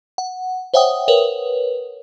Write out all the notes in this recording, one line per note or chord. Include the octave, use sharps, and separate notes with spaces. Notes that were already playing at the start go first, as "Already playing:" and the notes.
F#5
C5 C#5 E5 F#5 G5 D#6
A#4 B4 C#5